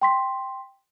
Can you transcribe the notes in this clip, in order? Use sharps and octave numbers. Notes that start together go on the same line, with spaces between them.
G5 C6 B6